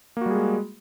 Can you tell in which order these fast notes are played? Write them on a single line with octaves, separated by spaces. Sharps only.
A#3 F#4 G3 G#4 G#3